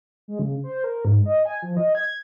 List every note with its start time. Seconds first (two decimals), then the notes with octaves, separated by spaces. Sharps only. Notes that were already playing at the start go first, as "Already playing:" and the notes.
0.28 G#3
0.39 C#3
0.64 C5
0.84 A#4
1.05 G#2
1.26 D#5
1.45 G#5
1.62 F3
1.77 D#5
1.95 G#6